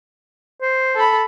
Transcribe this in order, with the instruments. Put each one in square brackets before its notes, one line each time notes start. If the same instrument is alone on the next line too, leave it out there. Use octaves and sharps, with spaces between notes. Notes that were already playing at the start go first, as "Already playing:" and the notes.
[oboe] C5
[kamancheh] A4 B5